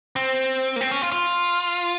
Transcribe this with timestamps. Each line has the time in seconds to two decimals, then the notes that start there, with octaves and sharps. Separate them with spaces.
0.16 C4
0.76 A#3
0.81 C4
0.91 C#4
1.02 F4
1.12 F4